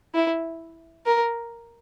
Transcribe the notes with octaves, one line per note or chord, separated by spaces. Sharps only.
E4
A#4